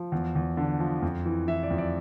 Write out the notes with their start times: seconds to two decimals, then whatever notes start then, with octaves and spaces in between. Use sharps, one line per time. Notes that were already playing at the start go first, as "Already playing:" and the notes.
Already playing: F3
0.12 E2
0.36 E2
0.57 D3
0.80 F3
1.02 F2
1.26 E3
1.48 E3 E5
1.63 D5
1.70 F2
1.78 D5